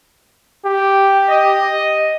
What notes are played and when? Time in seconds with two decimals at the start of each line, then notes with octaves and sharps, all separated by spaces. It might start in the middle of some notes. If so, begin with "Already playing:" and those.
0.65 G4
1.29 D#5